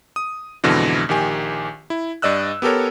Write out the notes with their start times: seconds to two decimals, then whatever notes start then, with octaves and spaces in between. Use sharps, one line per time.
0.16 D#6
0.64 F2 G#2 B2 D3 E3
1.09 A#1 D#3 G4 G#5
1.90 E4
2.22 G2 D5 D#5 E6 F#6
2.62 B3 G4 A4 A#4 C#5